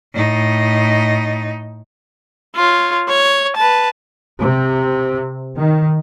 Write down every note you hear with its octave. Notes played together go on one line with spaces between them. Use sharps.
A2 D#4
F4 C#5
C#5
B4 A5
C3
D#3